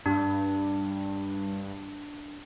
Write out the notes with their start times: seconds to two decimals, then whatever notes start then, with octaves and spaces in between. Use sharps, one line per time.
0.06 G2 D4